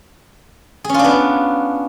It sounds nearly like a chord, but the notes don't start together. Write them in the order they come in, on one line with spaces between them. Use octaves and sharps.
G#4 C#4 F4 D4 B3